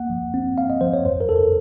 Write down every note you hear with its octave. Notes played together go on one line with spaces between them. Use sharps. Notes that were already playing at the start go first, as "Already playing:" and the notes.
Already playing: A#3 F#5
F3
C4
C4 F5
D#5
F3 C5
C#5
F2 C5
A#4
F2 A4
A#4